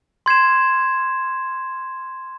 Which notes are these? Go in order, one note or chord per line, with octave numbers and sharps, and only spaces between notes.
C6 G#6 C7 E7